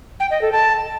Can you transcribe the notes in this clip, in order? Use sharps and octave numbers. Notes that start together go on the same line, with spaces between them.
G5
D#5
A4
A5